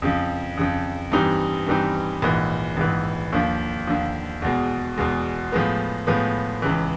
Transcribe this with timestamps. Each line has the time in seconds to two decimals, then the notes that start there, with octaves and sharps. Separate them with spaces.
0.02 F2 C#3 F3
0.57 F2 C#3 F3
1.12 G2 E3 G3 C4 D#4
1.67 G2 E3 G3 C4 D#4
2.22 A#1 G#2 E3
2.77 A#1 G#2 E3
3.32 D#2 D3 F3
3.87 D#2 D3 F3
4.42 E2 B2 G#3
4.97 E2 B2 G#3
5.52 A2 F3 G#3 B3
6.07 A2 F3 G#3 B3
6.62 C#2 C#3 E3